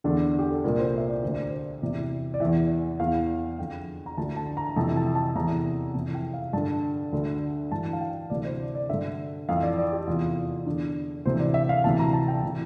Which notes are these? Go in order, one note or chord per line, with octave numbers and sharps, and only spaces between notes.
E2 D3 D4
G4
A4
C2 A#2 A#4
C5
E5
D5
D2 D3 C5
D5
C5
E2 C3 E3 D5
D5
E2 E3 E5
E2 E3 F5
F2 D3 G5
A#5
D2 D3 A5
A5
A#5
F2 C3 E3 A5
A5
A5
E2 C3 E3 A#5
F2 C3 E3 A5
G5
F5
G2 D3 A5
D2 D3
G2 E3 A5
F5
G5
D2 C3 E3 D5
C5
D5
D5
G2 D3 E5
F2 E3 F5
D5
D5
G4
E2 C3 E3 F4
E2 D3 D4
D2 C3 E3 C5
D5
E5
F5
D2 C3 E3 A5
A#5
A5
G5
C3 E3